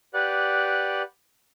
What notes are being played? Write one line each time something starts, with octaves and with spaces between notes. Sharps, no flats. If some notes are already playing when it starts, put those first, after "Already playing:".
G4 B4 D5 F#5 F#6